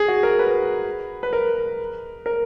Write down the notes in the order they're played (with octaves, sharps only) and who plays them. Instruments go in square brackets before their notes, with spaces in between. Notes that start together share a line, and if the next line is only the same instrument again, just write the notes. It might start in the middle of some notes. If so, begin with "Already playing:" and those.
Already playing: [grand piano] G#4
F#4
A#4
B4
B4
A#4
A#4